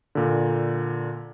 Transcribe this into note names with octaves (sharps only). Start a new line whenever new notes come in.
A#2 D3